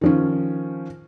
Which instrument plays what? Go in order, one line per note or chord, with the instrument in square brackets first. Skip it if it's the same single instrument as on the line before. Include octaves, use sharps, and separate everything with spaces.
[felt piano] D#3 F3 C#4